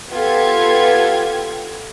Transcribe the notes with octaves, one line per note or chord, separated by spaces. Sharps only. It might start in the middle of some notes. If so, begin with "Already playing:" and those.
B3 F4 G4 A4 G#6